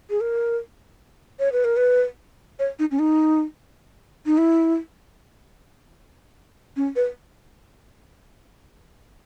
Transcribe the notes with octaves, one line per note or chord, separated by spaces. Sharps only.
G#4
A#4
C#5
B4
A#4
B4
C#5
D#4
C#4
D#4
D#4
E4
C#4
B4